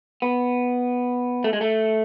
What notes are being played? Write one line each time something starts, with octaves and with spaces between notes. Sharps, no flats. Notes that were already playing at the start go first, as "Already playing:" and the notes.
B3
A3
G#3
A3